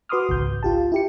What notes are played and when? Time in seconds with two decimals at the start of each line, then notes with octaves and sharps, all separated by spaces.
0.09 F#4 B4 C6 D6 D#6 F6
0.29 G#1 C#2 G6
0.63 F4 G4 A5
0.92 E4 G4 C#7